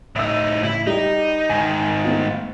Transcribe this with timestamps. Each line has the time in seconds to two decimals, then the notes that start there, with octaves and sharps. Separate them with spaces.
0.16 A2 D#4 E5 E6
0.63 A1 E4
0.87 G3 D#4 G4
1.49 G#2 D#3 G#5
2.04 A3 B3 F4